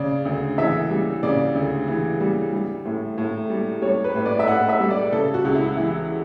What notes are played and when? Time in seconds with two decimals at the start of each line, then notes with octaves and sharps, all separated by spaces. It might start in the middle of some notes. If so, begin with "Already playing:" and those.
Already playing: C#3 D5
0.25 D2
0.58 E3 E5
0.90 G3
1.23 C#3 D5
1.55 D2
1.88 E3
2.20 G3
2.53 G3
2.85 A2
3.18 A2
3.50 G3
3.82 G3 C#5
4.04 B4
4.15 A2
4.26 D5
4.39 E5
4.47 A2 F#5
4.69 E5
4.80 G3
4.91 D5
5.12 C#3 A4
5.34 F#4
5.45 C#2
5.55 E4
5.77 E3 E4